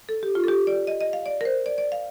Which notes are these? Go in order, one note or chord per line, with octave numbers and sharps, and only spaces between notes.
A4
G4
F4
A4
G4
D5
D#5
D#5
F5
D5
A#4
C5
D5
D5
F5